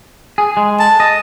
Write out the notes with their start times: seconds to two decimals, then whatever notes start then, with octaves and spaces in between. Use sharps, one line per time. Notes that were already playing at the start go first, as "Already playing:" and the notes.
0.38 G#4
0.57 G#3
0.80 A5
1.00 D#5